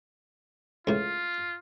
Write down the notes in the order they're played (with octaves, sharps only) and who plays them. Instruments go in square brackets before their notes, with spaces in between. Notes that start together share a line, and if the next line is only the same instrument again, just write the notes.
[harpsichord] C#2 A2 [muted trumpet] F4